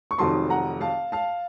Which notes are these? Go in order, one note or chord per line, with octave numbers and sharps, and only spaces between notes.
C#6
F1 F2 D#3 F#3 A5 C6
F#5 A#5
F5 A5
F5 A5